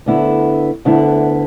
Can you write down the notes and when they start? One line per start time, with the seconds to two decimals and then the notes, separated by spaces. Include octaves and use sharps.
0.06 D2 D3 B3 E4
0.85 D2 D3 B3 E4